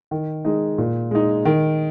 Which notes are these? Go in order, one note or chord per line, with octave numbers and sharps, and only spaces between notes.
D#3
G#3 D#4
A#2
G#3 D#4
D#3